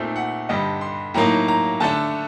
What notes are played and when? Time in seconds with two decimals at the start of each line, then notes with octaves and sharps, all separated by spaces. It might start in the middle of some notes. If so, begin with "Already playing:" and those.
Already playing: A#2 A3 C4 D#4
0.16 F#5
0.49 G2 D3 G3 D#5
0.81 C6
1.14 A2 F#3 A#3 D#4 A#5
1.48 A#5
1.80 D3 A3 D4 A5